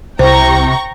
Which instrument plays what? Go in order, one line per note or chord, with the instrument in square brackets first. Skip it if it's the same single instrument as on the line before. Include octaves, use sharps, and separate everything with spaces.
[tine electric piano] C2 E4 [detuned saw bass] C3 [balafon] C5 [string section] G5 A#5 C#6